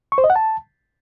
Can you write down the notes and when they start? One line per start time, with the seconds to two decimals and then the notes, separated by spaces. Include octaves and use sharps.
0.12 C#6
0.18 C5
0.24 D#5
0.30 F#5
0.36 A5